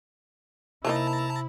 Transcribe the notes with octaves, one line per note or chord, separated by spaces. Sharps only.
C3 E3 A#3 D#4 E4 A5 A#5